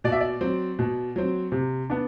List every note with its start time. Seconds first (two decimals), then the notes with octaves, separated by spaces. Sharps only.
0.04 B2 D5
0.12 E5
0.20 D5
0.41 F#3 C4
0.79 B2
1.16 F#3 C4
1.52 C3
1.90 B3 D4